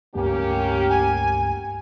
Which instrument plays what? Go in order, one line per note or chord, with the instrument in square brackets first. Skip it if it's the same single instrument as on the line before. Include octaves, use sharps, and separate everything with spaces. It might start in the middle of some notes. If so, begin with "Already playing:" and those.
[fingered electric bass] C#2 G2 A3 [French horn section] A#3 C#4 G4
[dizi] G#5